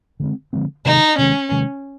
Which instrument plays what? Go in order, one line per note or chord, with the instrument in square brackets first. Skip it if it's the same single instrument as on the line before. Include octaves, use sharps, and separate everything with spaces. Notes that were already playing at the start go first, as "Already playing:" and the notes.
[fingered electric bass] D3 F3 G#3 C4
D3 F3 G#3 C4
[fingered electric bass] C3 D#3 G#3 [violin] D#4
[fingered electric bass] C3 D#3 G#3 [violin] C#4
[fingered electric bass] C3 D#3 G#3